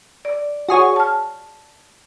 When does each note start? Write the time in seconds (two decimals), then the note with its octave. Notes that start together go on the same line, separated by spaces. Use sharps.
0.25 D5
0.69 F#4 G#4 C#5
0.96 A5 F6